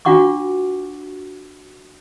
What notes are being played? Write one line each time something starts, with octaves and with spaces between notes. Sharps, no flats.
D4 F4 F#4 F#5 C#6 D6